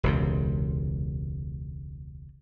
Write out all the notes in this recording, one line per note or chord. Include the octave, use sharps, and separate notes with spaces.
E1 C#2 C3